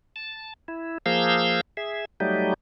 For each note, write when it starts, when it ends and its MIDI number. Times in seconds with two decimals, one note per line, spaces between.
0.16 0.54 81
0.68 0.98 64
1.06 1.61 53
1.06 1.61 58
1.06 1.61 68
1.06 1.61 77
1.06 1.61 88
1.06 1.61 91
1.77 2.05 68
1.77 2.05 76
2.20 2.54 54
2.20 2.54 55
2.20 2.54 57
2.20 2.54 63
2.20 2.54 67